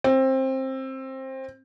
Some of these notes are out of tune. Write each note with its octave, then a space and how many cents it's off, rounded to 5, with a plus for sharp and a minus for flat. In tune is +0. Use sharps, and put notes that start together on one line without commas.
C4 +20